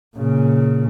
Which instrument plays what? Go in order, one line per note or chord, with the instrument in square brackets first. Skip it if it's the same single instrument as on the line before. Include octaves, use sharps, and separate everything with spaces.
[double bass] A#2 C#3